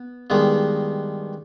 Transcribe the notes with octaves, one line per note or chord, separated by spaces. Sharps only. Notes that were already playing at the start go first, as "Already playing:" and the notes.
Already playing: B3
G2 D#3 G#3 B3